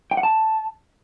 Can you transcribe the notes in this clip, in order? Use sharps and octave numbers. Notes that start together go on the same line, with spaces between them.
G5
F#5
A5